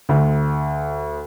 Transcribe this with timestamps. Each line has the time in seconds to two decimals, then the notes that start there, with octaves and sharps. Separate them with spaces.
0.09 D2